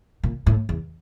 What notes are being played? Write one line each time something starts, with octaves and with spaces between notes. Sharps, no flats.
A#2
A2
E2